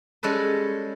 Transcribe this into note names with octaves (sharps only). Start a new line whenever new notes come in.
G3 G#3 C#4 A4 B4